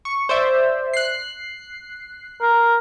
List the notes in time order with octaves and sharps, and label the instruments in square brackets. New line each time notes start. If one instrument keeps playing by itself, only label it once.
[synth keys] C#6
C5 D5 E5
F#6 C7
[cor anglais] A#4